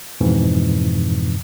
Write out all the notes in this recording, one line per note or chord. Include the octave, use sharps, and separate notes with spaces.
F2 G#2 B2 E3